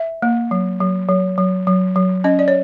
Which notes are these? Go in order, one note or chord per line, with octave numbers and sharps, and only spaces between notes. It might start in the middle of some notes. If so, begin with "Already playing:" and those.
Already playing: E5
A#3
F#3
F#3
F#3
F#3
F#3
F#3
C#4 D#5
D5
C#5